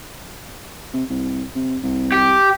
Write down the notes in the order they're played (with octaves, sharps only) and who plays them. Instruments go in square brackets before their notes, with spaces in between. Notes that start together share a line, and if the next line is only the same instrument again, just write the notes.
[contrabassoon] C3
C2
C3
C2
[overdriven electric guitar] G4